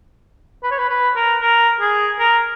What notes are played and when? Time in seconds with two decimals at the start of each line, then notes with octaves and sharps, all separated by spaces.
0.63 B4
0.71 C#5
0.78 B4
0.90 B4
1.16 A#4
1.42 A#4
1.80 G#4
2.20 A#4